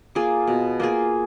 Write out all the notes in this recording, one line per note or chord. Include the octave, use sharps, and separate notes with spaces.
A#3 F4 G#4
B2
A#3 F4 G#4